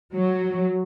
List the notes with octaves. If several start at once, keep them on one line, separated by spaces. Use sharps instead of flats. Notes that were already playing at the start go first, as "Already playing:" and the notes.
F#3